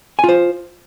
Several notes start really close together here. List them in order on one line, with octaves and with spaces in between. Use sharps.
G#5 F4 C5